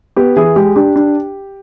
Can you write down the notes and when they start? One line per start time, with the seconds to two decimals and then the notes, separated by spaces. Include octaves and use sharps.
0.16 B3 G4
0.36 E3 G#4
0.56 G#3 G4
0.76 D4 G4
0.96 D4